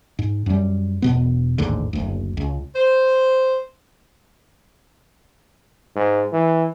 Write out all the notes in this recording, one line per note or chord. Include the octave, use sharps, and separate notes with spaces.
G#2
F#2 G3
E1 B2 B3
A1 D#2 G#2 D3
F#1 D2
C#2
C5
G#2
E3